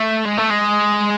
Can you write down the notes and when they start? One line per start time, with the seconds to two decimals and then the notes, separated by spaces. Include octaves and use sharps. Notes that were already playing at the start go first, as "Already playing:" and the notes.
Already playing: A3
0.25 G#3
0.37 A3
0.50 G#3